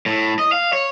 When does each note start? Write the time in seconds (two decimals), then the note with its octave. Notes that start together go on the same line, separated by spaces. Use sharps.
0.06 A2
0.39 D#5
0.52 F5
0.73 C#5